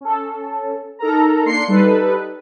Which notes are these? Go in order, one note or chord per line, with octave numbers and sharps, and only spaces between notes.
C#4 A4
D#4 A4 A#4 A#5
A#3 D4 C6 C7 C#7
G3 D#4 A4 B4